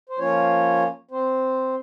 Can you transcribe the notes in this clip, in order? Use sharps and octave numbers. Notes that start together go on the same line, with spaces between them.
C5
F3 A#3 C#4 F4 C#5
C4 C5